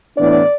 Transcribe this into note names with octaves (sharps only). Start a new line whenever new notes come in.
A2 E3 B3 D4 D5